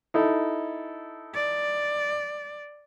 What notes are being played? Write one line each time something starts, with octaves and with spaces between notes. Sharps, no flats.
D#4 E4 A4
D5